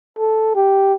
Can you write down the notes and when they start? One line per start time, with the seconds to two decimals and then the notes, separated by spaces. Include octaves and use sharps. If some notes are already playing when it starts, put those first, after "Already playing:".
0.18 A4
0.55 G4